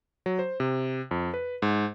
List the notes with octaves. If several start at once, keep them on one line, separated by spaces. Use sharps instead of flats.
F#3
C5
C3
F2
B4
G#2